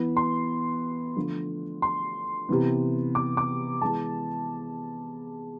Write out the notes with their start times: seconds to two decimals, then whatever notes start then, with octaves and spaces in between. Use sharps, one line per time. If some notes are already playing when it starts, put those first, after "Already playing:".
Already playing: E3 B3
0.17 C6
1.16 D3 F3 A3
1.82 C6
2.49 C3 E3 B3
3.15 D6
3.37 D6
3.81 E3 G#3 B3 A5